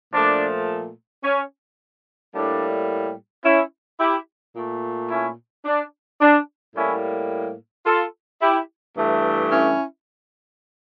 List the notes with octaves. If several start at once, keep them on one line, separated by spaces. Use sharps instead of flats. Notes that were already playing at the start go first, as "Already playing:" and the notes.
A#2 F3 A3 D4
C#4
A2 G3 A#3 D4
C#4 E4
E4 G4
A#2 A3
C#4 E4
D4
D4
A2 G3 A#3 C#4 E4
F4 A4
E4 G4
G2 E3 A3
C#4 E4